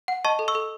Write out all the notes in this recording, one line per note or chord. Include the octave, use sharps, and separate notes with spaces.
F#5
D#5 A5 C#6
A4
C#6 E6
A4